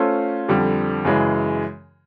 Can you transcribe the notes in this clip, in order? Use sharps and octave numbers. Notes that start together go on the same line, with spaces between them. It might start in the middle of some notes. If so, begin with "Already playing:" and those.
Already playing: A3 C#4 F4 A4 C5
F2 D3 G3
F#2 C#3 E3 G#3